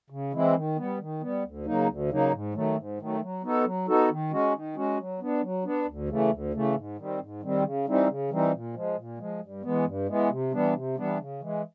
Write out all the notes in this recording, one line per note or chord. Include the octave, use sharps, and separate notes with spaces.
C#3
E3 G#3 C4 E4
D#3
G3 B3
D#3
G3 B3
D2
C#3 F#3 A#3 D#4
D2
C#3 F#3 A#3 D#4
G#2
D#3 F#3 A3
G#2
D#3 F#3 A3
F#3
B3 D#4 F#4 A4
F#3
B3 D#4 F#4 A4
D#3
G#3 C#4 F#4
D#3
G#3 C#4 F#4
F#3
B3 D4
F#3
B3 D4
D2
C#3 E3 A3
D2
C#3 E3 A3
G#2
D#3 G3 C4
G#2
D#3 G3 C4
C#3
E3 G3 C4 D#4
C#3
E3 G3 C4 D#4
A#2
F3 G#3
A#2
F3 G#3
G2
E3 G#3 B3
G2
E3 G#3 B3
C3
E3 G3 B3 D4
C3
E3 G3 B3 D4
C#3
E3 G#3